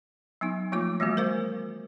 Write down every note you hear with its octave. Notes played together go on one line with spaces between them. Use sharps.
F#3 B3 D#4
F3 A3 A#3 F4 D6
E3 G3 A3 B3 F#4
A#4 C5 F5